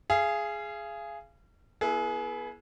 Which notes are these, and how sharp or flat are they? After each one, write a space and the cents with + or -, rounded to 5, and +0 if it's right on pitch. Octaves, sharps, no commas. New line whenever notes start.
G#4 +0 F5 -35
B3 -30 E4 +5 G#4 +25